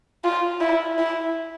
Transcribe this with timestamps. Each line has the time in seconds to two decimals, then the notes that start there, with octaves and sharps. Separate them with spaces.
0.24 F4
0.60 E4
0.98 E4